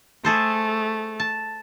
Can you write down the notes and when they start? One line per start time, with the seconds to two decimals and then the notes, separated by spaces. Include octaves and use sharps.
0.25 A3 G#4 A4 C5
1.20 A5